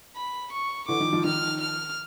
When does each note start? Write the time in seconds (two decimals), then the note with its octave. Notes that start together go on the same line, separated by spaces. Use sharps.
0.15 B5
0.52 C#6
0.88 D3 E3 D6
1.00 D#3 F3
1.12 D#3 F3
1.24 D#3 F3 F6
1.60 F6